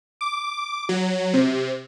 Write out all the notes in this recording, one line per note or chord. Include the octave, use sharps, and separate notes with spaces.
D6
F#3
C3